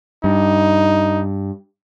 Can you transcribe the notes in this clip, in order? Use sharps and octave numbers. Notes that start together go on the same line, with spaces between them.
G2 D#4